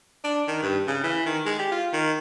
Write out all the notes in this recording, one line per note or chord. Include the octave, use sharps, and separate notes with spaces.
D4
D#3
G2
C#3
E3
D#3
G#3
G4
F4
D#3